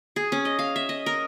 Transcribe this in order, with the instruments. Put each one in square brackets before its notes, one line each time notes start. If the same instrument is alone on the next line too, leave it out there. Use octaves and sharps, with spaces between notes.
[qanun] G#4
C#4
D#5
F5
E5
D#5
A#4